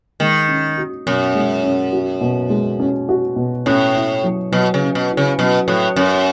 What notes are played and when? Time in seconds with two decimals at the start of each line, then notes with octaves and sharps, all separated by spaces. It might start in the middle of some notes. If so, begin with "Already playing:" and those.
0.20 D#3 G#3
0.48 C#4
0.78 F#4
1.06 F#2 B2
1.35 G#3
1.63 C#4
1.93 F#4
2.21 B2
2.50 G#3
2.80 C#4
3.09 F#4
3.36 B2
3.66 A2 C#4
3.95 E4
4.24 F#3
4.52 B2 F#3
4.74 C#3
4.81 C#4
4.95 B2
5.10 E4
5.17 C#3
5.39 B2 F#3
5.68 A2 F#3
5.96 F#2 C#4